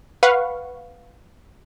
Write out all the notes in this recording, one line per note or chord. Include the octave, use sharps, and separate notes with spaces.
B4 F5 F#5 B5 C#6